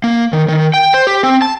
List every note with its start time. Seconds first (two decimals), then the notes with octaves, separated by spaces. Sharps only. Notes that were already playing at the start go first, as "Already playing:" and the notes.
0.04 A#3
0.33 D#3
0.48 D#3
0.74 G5
0.94 C5
1.07 G4
1.23 C4
1.42 A5